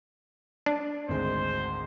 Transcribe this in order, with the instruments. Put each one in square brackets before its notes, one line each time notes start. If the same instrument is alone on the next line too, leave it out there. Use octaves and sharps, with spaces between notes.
[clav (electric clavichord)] D4
[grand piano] G#1 D2 G#3 [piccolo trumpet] C5